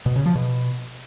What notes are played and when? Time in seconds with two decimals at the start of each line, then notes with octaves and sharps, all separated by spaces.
0.06 B2
0.16 C#3
0.26 F3
0.35 B2